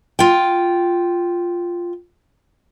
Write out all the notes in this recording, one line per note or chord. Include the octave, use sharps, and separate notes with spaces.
F4 G5